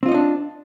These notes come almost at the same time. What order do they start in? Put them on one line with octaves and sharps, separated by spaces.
C4 F4 D#5 D#4 D4